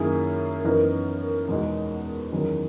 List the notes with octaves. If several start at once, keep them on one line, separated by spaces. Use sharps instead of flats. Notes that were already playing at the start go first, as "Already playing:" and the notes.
Already playing: F#2 D#3 A#3 E4 G#4
F#2 E3 B3 D#4 A#4
E2 B2 G#3 D#4 F#4
E2 D#3 F#3 C#4